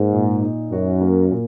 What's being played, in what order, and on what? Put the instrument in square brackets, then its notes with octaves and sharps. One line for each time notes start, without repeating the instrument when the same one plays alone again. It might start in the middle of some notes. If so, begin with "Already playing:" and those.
Already playing: [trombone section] G#2 [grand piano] A#3
[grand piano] A#2
D#4
[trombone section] F#2 [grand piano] F#4
[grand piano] A#3
A#2